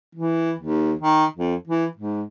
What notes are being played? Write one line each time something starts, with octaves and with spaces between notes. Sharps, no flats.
E3
D#2
D#3
F2
E3
G#2